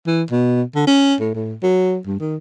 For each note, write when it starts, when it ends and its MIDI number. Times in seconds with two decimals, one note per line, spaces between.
0.07 0.23 52
0.31 0.62 47
0.75 0.84 50
0.87 1.15 61
1.20 1.30 45
1.35 1.56 45
1.63 1.98 54
2.06 2.19 43
2.20 2.36 51